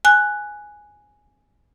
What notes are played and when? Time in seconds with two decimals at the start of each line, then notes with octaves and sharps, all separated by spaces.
0.05 G#5 F#6